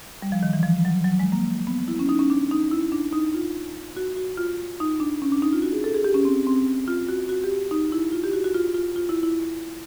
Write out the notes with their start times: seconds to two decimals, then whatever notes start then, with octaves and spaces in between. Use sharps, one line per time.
0.22 G3
0.32 F3
0.43 D#3
0.53 E3
0.63 F3
0.85 F#3
1.04 F#3
1.20 G#3
1.32 A#3
1.67 B3
1.88 E4
1.99 C#4
2.09 D#4
2.19 C#4
2.30 D4
2.51 D#4
2.71 E4
2.92 D4
3.13 D#4
3.34 F4
3.97 F#4
4.17 F#4
4.37 F4
4.80 D#4
5.00 D4
5.22 C#4
5.32 D4
5.42 D#4
5.53 F4
5.62 F#4
5.73 G#4
5.84 A4
5.94 G#4
6.04 G4
6.14 C#4
6.25 C4
6.47 C4
6.88 F4
7.09 F#4
7.29 F#4
7.44 G4
7.71 D#4
7.92 E4
8.12 F4
8.24 G4
8.33 F#4
8.44 F#4
8.54 F4
8.74 F4
8.96 F4
9.09 E4
9.23 E4